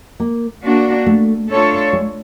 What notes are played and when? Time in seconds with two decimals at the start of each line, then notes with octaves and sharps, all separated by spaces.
0.20 A#3
0.64 A#3 D4 F#4
1.06 A3
1.50 A3 D4 F4 A4 C#5
1.93 G#3